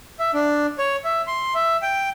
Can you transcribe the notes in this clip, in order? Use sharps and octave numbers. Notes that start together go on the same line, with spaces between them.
E5
D4
C#5
E5
C6
E5
G5